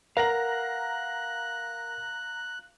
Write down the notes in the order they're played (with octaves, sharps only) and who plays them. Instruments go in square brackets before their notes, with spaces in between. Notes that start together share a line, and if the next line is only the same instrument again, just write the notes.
[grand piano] A#4 B4 [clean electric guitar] F5 F#5 [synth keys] A#5 A#6 [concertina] F#6